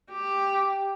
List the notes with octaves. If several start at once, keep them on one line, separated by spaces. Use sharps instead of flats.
G4